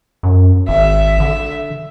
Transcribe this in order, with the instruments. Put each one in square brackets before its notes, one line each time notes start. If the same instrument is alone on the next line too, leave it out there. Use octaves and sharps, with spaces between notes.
[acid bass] F#2
[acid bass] G#1 [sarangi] E5
[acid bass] D3